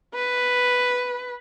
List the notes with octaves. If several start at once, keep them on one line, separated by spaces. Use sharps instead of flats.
B4